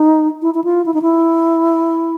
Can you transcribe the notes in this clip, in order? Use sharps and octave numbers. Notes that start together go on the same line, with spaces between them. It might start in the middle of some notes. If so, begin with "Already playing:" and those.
Already playing: D#4
E4
E4
F4
E4
D#4
E4